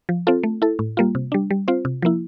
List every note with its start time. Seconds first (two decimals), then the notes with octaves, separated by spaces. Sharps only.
0.09 F3
0.27 C4 F4 A4
0.43 A3
0.62 E4 A4
0.79 A2
0.97 G3 A#3 F4
1.15 C3
1.32 G3 D4
1.51 G3
1.68 C4 F4 C5
1.85 C3
2.02 F3 A#3 E4